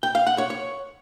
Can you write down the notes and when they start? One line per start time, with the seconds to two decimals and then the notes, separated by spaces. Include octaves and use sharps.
0.03 G5
0.15 F5
0.27 F#5
0.38 C#5
0.50 C#5